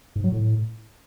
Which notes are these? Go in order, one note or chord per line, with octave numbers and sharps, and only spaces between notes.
G#2
F#3
A2